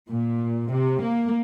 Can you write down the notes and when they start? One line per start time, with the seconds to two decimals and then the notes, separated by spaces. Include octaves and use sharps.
0.10 A#2
0.71 C3
1.02 A#3